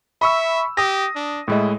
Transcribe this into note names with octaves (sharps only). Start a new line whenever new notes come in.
E5 B5 C#6 E6
G4 D#6 A#6
D4
A2 G#3 E4 D#5